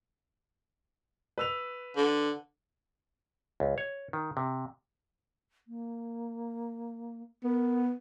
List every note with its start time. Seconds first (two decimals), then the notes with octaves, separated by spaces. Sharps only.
1.38 B4 E6 F7
1.97 D3
3.60 C#2
3.78 C#5
4.13 D#3
4.37 C3
5.68 A#3
7.44 B3 A#4